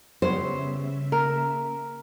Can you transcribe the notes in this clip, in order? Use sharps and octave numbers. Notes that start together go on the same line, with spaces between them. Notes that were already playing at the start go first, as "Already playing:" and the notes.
C#3 G3 B3 C5 C#5 E5
A#3 A#4